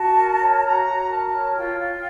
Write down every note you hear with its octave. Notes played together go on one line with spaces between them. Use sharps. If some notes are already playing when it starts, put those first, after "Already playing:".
Already playing: F#4 A5
A#4
C#5
F#4 A#5
F#4
A#4 A5
C#5
F4 G5
F4